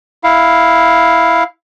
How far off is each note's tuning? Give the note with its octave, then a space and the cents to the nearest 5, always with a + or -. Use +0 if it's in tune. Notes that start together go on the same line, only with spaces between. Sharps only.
E4 +0 F5 +0